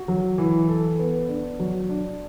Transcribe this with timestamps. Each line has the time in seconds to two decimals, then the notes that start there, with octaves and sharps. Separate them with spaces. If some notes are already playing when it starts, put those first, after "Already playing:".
Already playing: F#4
0.08 F#3
0.38 E3
0.69 A4
0.99 B3
1.29 D4
1.59 F#3
1.89 D4